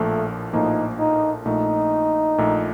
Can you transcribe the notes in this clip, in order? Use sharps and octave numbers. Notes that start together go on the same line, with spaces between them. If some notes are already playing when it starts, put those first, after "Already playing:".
Already playing: A#1 A2 F3 A3 A#3
A#1 A2 F3 A#3 D#4
D#4
A#1 A#2 A3 D#4
A#1 A#2 A3